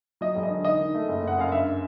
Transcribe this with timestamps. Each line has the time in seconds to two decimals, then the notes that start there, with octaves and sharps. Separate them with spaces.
0.21 F#3 D#5
0.36 E1
0.43 D#5
0.50 D3
0.65 D#3 D#5
0.80 D#3
0.95 A3
1.09 F#1
1.23 F#2 F#5
1.38 F#2 F5
1.52 G2 E5